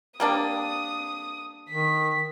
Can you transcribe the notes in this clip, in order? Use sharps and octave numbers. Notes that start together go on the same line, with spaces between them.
G3 A#3 D4 D#6
D#3 B6